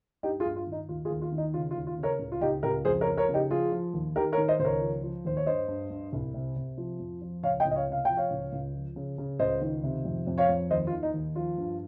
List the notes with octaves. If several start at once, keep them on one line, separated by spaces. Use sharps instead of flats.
G2 D#4 G4
F4 G#4
G2
F4
D#3
D#4
D#2 F4
F4 G#4
D#2
F4
D#3
D#4
C#3 F4
F4
D#2
F4
C#3
A#4 C#5
C#2
F4
C#2 D#4 G4
C#2 G4 A#4
F2 G#4 C5
A#4 C#5
F3
A#4 C#5
C#3
D#4 G4
F3 F4 G#4
F3
D#2
D#3 G4 A#4
A#4 C#5
D#3
C5 D#5
C#2 C5
A#4 C#5
F3
F3
D#2 C5
C#5
G2 C5 D#5
G2
G2
C2
C3
C3
F3
F2
F3
C#2 C#5 F5
D#5 G5
C#2
D#5
C#5 F5
C3 F5
F3 G5
C#5 F5
C#2
C#2
F3
C#3
C#3
C#2 C5 D#5
D#3
C3
F2
F2
C#5 F5
F2
D#2 C5 D#5
F4
D#3
D#4
D#2
F3 F4
G2